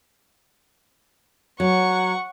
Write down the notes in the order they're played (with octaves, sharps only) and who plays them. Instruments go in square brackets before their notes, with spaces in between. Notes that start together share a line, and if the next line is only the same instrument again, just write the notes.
[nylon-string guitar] F#3 [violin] F#5 C#6